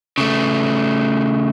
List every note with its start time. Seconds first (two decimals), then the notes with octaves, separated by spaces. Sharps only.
0.18 C#3 A3